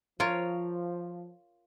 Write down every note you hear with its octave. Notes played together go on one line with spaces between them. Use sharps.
F3 F4 A#4 C#5